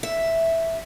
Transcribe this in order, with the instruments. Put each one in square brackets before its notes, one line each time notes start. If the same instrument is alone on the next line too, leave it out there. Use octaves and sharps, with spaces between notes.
[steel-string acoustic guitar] E5